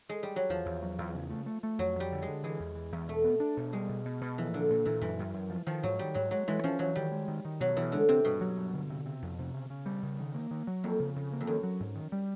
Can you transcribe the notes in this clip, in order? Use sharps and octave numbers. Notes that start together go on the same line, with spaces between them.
G#3
G3
F#3
E2 F3
E2
F#3
E2
C#3
A3
A3
A3
F2 F#3
F2 G3
D3
G#3
D3
E3 G#3
E2
E3
E2
B2 A3
B3
D4
B2
G3 G#3
B2
B2
B2
E3 F3
A#2 D3
A#2
A#2 E3
F#2 E3
F#2
F#2
F3
D#3 F3
G#2 F#3
D#3 G3
G#2 F#3
F#3 G#3
E3 G#3
F3 C#4
E3 F#3
D#3 G3
G#3
D#3
D#3
B2 F#3
B2 E3
D3 G#3
C3 C4
G2 B2
F#3
G2
D3
C3
C3
F2
C3
C#3
C#3
G3
C#3
D#3
A#3
D#3
F#3
F2 A#3
C#3
C#3
A#3
F2
F#2 D#3
F#3
G#2
D#3
G3